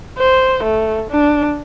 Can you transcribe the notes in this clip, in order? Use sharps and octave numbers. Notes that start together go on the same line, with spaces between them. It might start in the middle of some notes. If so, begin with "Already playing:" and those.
C5
A3
D4